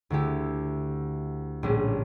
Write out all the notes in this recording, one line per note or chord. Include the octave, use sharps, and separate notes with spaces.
D2 D3 A3 E4 G4
A#1 A2 G3 C#4